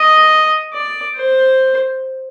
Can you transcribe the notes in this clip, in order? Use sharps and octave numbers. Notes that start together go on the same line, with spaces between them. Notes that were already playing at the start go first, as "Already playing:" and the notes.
Already playing: D#5
D5
C5